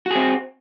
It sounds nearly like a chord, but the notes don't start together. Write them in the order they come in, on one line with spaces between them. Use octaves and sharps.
F#4 G#4 C4